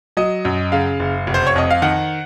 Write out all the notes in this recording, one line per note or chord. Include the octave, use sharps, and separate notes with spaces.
F#3 D#5
F#2
C#3 F5
F#1
F1
C5
C#5
F2 D#5
F5
D#3 F#5